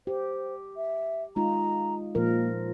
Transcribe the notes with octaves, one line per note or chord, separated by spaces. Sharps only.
G4 C5
E5
G#3 D#4 F4 A#5
A#2 F3 A#3 A#4